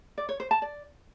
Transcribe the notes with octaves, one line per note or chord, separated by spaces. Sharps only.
D5
C#5
C5
A5
D5